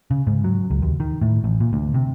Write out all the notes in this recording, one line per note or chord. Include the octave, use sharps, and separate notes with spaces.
C#3
G#2
F#3
C#2
D#2
D#3
A2
A1
A#2
D2
C3